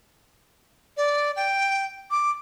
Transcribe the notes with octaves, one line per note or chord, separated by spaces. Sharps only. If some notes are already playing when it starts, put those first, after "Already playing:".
D5
G5
D6